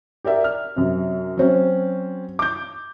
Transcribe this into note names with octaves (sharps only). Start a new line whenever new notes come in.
G4 A#4 D5 E5
F6
F#2 C3
F#3 C4 C#4
D6 G6